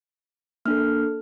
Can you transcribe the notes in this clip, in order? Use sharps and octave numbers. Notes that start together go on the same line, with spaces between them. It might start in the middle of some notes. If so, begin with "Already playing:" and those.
A#3 D4 A4 F6